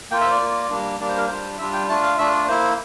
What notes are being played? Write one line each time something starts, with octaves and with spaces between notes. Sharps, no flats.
A#3 F4 G5
E5
C5
D5
A#3 F4
G3 A#3 D4
G3 A#3 D4 D5
C5
A#4
G3 D4 F4 C5
G3 D4 F4 E5
G5
A3 D4 F4 A5
F5
A3 D4 F4 E5
D5
A#3 E4 C5